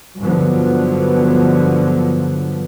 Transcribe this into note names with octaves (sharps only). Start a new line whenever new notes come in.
G2 D3 F3 F#3 B3